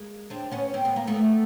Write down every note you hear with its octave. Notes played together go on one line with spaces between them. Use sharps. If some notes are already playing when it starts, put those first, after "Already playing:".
Already playing: G#3 A#3
C4 D4
B3 C#4
C4
B3
A#3
A3 B3